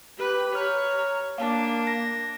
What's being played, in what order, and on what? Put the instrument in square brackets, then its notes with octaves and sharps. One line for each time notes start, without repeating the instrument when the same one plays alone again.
[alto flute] G4 [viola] B4 B5
[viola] C#5 [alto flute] A#5 [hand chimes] F6
[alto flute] A#3 [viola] D4 [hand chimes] F5 A5
[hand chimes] A#6